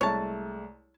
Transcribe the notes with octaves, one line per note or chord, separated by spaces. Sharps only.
C2 G#3 A3 C#5 A5